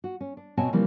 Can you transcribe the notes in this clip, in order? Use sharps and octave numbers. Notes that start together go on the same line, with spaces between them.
F#4
C#4
D4
B2 C4 F#4 C#5 G#5 A5
C#3 E3 F3 G3 A#3 C4